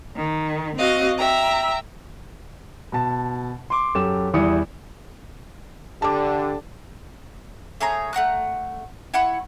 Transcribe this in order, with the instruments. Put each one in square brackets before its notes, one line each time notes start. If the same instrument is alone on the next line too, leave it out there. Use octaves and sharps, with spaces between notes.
[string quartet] D#3
C4 F#4 D#5 F5
E5 G5 A#5
[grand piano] B2 A5
C6 D6
F#2 G4 A4 E7
E2 G3 E4 D#6 C#7
[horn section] D3 [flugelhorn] G4 [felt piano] A5 D6
[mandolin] A3 G#4 C#5 A#5
A3 F#5 A#5 F#6
E4 F#5 B5 C#6